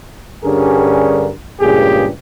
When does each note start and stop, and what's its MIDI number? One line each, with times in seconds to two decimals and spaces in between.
0.44 1.30 43
0.44 1.30 50
0.44 1.30 55
0.44 1.30 61
0.44 1.30 68
0.44 1.30 70
1.60 2.08 37
1.60 2.08 43
1.60 2.08 46
1.60 2.08 67
1.60 2.08 68